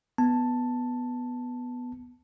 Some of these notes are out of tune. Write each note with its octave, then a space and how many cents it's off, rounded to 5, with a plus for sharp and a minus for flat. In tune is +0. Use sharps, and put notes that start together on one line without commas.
B3 +0 A5 +5